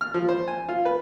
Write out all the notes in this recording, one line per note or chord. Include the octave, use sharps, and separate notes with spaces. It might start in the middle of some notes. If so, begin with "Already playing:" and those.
F6
F3
C5
G#5
F4
B4